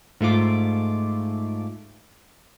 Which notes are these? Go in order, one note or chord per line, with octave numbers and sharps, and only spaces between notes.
G#2 A3 F4 D6